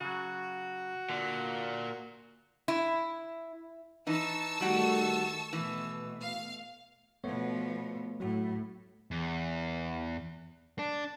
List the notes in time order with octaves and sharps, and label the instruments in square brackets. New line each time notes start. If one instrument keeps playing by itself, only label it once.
[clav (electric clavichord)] C#3 F#3 [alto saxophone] F#4
[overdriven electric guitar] A#2 [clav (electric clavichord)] D3
[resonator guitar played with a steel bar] E4
[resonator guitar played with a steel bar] E3 D#4 [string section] A5 C#6 E6
[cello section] D#3 A3 A4 [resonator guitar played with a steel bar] G3 F#4
[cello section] B2 A3 [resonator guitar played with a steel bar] E3
[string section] F5
[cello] B2 F3 [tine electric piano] A3 B3 C#5
[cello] A2 [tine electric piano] F#3 F#4
[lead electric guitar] E2
D4